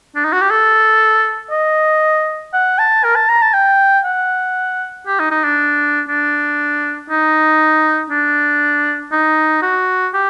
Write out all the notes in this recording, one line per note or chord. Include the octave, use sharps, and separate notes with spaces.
D4
D#4
F#4
G4
A4
D#5
F#5
A5
A#4
A5
A#5
A5
G5
F#5
G4
D#4
D#4
D4
D4
D#4
D4
D#4
F#4
G4